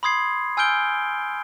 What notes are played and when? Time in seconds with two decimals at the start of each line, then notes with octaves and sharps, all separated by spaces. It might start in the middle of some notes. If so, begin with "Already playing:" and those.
0.03 B5 C6 D#6 G#6 C7
0.57 G#5 E6 F6 G6 D7 G7